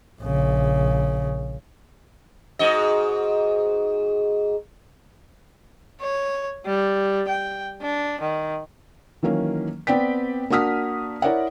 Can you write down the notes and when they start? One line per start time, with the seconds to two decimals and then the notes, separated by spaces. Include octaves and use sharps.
0.22 A#1 C#3
2.59 G#2 F#4 D#5
6.01 C#5
6.66 G3
7.28 G5
7.82 D4
8.21 D#3
9.23 D#3 E3 F#3 A#3 C#4
9.87 B3 C4 D5 G5 B6
10.50 A#3 D4 F#4 D#6 F6 B6
11.22 E4 A#4 C#5 D5 E5 F#5